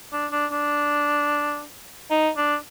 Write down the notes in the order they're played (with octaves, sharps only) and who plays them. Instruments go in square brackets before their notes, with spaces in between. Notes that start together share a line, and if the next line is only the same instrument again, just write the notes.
[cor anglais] D4
D4
D4
D#4
D4